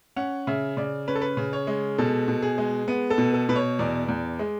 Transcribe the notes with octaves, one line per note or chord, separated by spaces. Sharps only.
C#4 F#5
C#3 E5
C#3 D5
C#4 B4
A4
B4
C#3
C#5
G#3
B2 A4
B2
G#4
G#3
B3
A4
B2
A4
B2 B4
C#5
E2 D5
E2
G#3